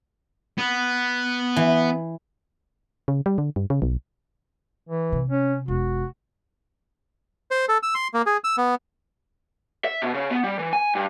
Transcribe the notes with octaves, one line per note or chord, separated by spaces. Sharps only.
B3
E3
C#3
G3
D3
G2
C#3
B1
E3
C3
C#4
E1 F#4
C5
A4
E6
C6
A#3
G#4
E6
B3
E5
B2
C#3
B3
G3
E3
G#5
G2